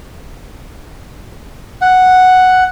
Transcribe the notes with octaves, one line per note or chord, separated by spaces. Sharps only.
F#5